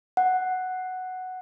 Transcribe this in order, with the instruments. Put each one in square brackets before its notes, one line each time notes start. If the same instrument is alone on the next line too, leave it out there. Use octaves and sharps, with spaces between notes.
[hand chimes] F#5